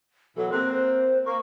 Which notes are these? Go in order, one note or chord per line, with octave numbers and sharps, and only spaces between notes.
B2 E3 F#3 A4
A#3 C4 F#6
C5
A#3 C#6